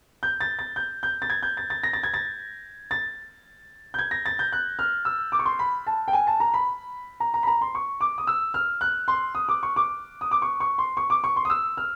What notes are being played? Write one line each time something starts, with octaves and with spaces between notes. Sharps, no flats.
G6
A6
A6
G6
G6
A6
G#6
G6
A6
A6
A#6
A6
G#6
A6
A6
G6
G#6
A#6
A6
G6
F#6
F6
E6
D6
C#6
C6
B5
A5
G5
G#5
A5
A#5
B5
A#5
A#5
B5
A#5
C6
C#6
D6
D#6
E6
F6
F#6
C6
D#6
D6
C#6
D6
D#6
D6
C#6
C#6
C6
C#6
D6
C#6
C6
D#6
E6
F6